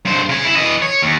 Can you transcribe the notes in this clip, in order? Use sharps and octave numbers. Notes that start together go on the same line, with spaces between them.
G2 C5
C#3 G#5
E4
E3 D#5
C#5
D#2